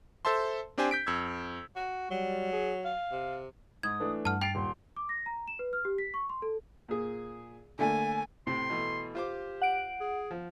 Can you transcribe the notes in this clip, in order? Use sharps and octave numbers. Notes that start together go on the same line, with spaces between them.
A4 C5 E5 A5 C6
C4 D4 G4 C5 G#5
G6 B6 D7
F2 E6 G#6
F#4
F#3 G3
G#4
F5
C3
G#2 D#6 G#6
E3 A3 D4
G2 F#5 A5 F6
G5 A6 C7 D7 F7
D#1 C6
D6
A#6
A#5
E7
B4
F6
G4
B6
C#6
C6
A4
A#2 G#4
D3 A3 A#3 G#5
A2 C3 C4 C6
B2 E3 A3
F4 G4 C5 D6
F#5 D7
G#4
F3